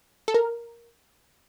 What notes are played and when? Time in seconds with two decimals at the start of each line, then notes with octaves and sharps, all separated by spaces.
0.28 A4
0.34 A#4